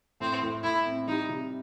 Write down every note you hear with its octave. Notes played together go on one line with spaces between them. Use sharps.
A2 C4
A2
A2 E4
C4
G3 D#4
C3